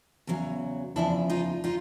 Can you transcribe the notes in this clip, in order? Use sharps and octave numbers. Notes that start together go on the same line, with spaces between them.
E2 C#3 F#3
E2 C#3 F3 D4 E4
D#4 F4
D#4 F4